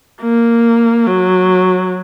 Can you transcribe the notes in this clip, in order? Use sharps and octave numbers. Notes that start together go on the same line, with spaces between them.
A#3
F#3